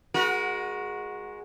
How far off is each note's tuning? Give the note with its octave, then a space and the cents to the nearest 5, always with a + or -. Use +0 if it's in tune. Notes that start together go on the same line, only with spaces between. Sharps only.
G#3 +0 F#4 -15 A#4 +40